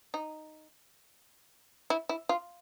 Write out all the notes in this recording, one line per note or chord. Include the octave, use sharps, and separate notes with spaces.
D#4
E4
E4
F4